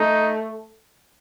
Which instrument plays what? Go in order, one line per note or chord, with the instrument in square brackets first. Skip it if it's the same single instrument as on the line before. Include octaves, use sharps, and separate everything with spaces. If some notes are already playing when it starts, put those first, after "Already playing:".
Already playing: [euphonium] A3 [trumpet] D#4